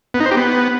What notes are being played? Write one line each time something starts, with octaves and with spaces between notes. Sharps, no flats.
B3
D#4
C5
G4
B3